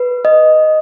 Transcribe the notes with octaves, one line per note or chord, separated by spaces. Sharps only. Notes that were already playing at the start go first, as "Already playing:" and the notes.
Already playing: B4
D#5